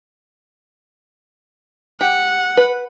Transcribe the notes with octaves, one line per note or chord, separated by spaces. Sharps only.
G4 F#5
B4